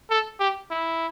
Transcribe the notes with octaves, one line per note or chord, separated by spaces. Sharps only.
A4
G4
E4